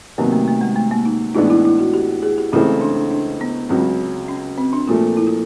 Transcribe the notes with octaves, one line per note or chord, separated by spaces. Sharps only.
C3 D#3 F#3 A#3 B3
A3
A3
G#3
A3
A#3
D#4
A2 E3 G#3 B3 D4 D#4
E4
E4
F#4
G4
G#4
G4
C#2 C#3 E3 A3 C4 E4
D4
D4
D4
B3
C#2 C#3 F#3 C4
C#4
C4
D4
A#2 F3 A3 F4
E4
F4